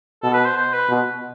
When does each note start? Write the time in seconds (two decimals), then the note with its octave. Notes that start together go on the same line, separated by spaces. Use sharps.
0.23 B2 A4
0.34 B4
0.46 C5
0.57 C5
0.74 B4
0.90 B2